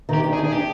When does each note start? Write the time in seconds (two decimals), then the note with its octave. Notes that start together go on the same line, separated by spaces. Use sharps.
0.09 D#3 G4
0.23 D4
0.33 G#4
0.37 D4
0.44 G#4
0.52 D4 G4